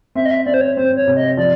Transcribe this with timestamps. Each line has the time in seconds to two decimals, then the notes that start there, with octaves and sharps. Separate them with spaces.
0.15 C4 E5
0.25 D#5
0.31 E5
0.46 C4 D5
0.54 C5
0.61 C#5
0.77 C4 C5
0.97 C#5
1.07 C3
1.17 D#5
1.37 F3 D5